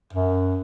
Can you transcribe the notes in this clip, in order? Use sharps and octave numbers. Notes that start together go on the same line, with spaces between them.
F#2